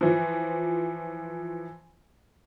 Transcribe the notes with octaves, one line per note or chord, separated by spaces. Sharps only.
E3 F3